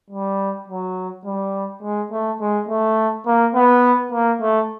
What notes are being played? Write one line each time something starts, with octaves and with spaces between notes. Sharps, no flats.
G3
F#3
G3
G#3
A3
G#3
A3
A#3
B3
A#3
A3